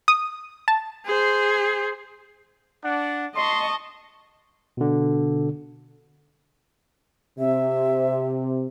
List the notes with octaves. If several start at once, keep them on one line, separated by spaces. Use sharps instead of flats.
D#6
A5
G#4 C5
D4 F#5
D#5 A5 C6 C#6
B2 D3
C3 E5